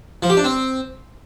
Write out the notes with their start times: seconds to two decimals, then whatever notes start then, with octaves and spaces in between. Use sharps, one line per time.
0.23 F3
0.30 G4
0.37 D4
0.44 C4